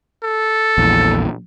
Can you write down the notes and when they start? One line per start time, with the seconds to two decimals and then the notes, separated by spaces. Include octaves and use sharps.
0.23 A4
0.78 A#1 E2